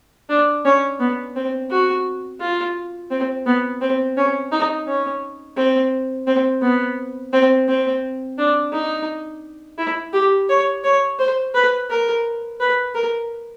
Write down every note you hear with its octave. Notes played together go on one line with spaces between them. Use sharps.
D4
C#4
B3
C4
F#4
F4
C4
B3
C4
C#4
D#4
C#4
C4
C4
B3
C4
C4
D4
D#4
E4
G4
C#5
C#5
C5
B4
A#4
B4
A#4